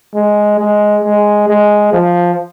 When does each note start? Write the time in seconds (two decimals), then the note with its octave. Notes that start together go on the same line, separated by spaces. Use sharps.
0.15 G#3
0.59 G#3
1.04 G#3
1.48 G#3
1.93 F3